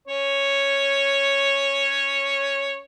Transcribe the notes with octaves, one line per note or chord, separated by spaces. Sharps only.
C#4 C#5